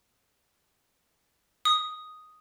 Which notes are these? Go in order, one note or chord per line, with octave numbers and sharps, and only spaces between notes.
D#6